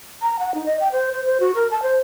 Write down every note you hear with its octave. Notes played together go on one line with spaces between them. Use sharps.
A#5
F#5
D#4
D#5
G5
C5
C5
C5
F#4
A#4
A5
C5